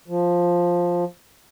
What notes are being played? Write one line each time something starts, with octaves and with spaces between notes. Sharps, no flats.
F3